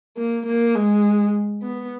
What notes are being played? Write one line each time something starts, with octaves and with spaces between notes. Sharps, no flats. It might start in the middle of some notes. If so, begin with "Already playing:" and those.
A#3
A#3
G#3
B3